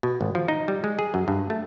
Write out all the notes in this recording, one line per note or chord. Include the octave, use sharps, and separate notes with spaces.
B2
G#1
F3
D#4
G3
G#3
G#4
F#2
G2
A3